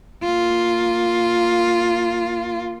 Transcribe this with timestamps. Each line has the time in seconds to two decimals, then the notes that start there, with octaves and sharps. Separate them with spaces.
0.23 A#3 F4